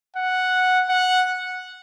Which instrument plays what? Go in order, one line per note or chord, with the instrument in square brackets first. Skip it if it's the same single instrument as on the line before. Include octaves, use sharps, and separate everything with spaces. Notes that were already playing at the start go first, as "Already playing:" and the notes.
[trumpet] F#5
F#5